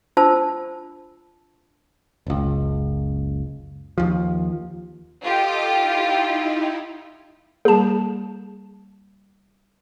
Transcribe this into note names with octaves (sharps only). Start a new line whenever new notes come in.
D4 F4 C5 A5 E6
F#1 C#2
D#2 F3
F4 G4 A4 D#5 D6
D#4 E4
G3 A#3 G#4 A5